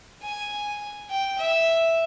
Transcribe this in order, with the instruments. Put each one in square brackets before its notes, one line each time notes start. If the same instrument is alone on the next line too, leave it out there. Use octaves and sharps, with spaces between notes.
[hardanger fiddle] G#5
G5
E5